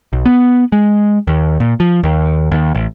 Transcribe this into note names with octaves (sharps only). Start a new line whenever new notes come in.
B1
B3
G#3
D#2
A#2
F3
D#2
D#2
A1